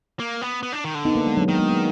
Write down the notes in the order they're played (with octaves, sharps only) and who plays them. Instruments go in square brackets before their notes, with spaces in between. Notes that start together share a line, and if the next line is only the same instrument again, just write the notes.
[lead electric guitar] A#3
B3
B3
D4
D#3
D3
[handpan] B3 D#4
A#3 D4
G#3 B3
F#3 A#3
[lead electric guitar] D#3 [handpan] F#3 A#3
[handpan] G#3 B3
F#3 A#3